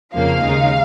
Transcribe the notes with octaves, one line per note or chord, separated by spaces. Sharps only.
F2 C#3 F3 A#3 F5
D#2 C#3 G#3 D#4